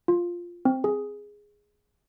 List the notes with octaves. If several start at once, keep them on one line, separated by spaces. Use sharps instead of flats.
F4
C4
G#4